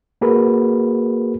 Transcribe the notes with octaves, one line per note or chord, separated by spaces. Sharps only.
A#3 F#4 G#4 A#4 B4